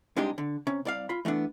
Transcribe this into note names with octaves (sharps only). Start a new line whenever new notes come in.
C2 C3 G#3 D4 D#4 G4
D3
C3 C#4
C2 D5 F5
F4 B5
E3 A3 B3 D4